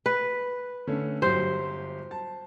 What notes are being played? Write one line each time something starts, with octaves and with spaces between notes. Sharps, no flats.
B4
D3 A3 C#4
G1 F#3 G4 C5
A5